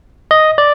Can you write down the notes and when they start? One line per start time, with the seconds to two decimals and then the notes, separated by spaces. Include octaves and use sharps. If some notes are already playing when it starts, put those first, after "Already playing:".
0.31 D#5
0.58 D5